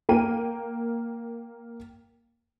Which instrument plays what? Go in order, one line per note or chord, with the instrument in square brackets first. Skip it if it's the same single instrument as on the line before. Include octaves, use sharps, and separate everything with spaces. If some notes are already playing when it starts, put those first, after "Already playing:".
[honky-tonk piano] A#3 A#4 G5 D#7